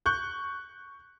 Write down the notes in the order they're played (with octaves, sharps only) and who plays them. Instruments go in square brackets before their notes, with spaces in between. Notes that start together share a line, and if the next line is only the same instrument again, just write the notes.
[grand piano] C#6 F#6 G6